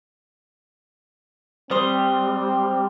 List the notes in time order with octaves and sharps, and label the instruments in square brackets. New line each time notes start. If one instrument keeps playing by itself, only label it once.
[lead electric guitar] G3 [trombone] C4 [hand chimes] C5 [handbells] C6 D#6